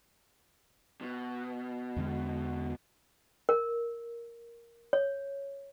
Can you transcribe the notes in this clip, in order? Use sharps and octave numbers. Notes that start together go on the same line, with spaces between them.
B2
E2 D3 G#3
A#4
C#5